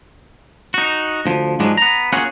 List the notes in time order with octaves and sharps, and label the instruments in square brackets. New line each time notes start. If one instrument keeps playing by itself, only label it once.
[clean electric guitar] D#4 F#4
D2 F3
G#2 F3 F#3 G#3 D4
B3 A#5
A#3 C#4 F4 F#4 G#4 F#5